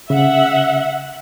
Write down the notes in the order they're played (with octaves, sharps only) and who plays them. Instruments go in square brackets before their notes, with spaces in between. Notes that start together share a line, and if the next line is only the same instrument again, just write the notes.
[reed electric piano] C#3 [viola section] E5 F#5